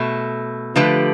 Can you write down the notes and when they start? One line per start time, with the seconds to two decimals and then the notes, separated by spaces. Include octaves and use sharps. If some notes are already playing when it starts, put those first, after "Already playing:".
Already playing: B2 A3
0.76 D3 F3 A3 G4 B4